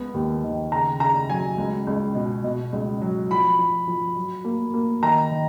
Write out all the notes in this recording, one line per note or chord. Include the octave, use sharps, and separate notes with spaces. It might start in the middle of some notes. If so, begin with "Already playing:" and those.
Already playing: C#2 B3
D#2
D#3
C#3 A#5
C#3 A#5
F#3 G#5
C#2
C#2
B2
B2
C#2
F#3
F3 B5
F3
F3
F#3
A#3
A#3
D#3 A#5
D#3